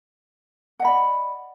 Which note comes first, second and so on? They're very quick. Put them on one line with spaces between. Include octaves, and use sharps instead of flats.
F#5 D#5 B5 D5